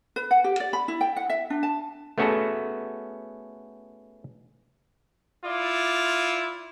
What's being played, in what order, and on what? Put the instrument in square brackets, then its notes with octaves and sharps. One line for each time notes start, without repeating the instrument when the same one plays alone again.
[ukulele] B4
F#5
G4
D5
B5
E4
G5
F#5
E5
D4
A5
[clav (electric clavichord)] A3 B3 C#4 F#4 G#4 A4
[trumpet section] E4 F4 D5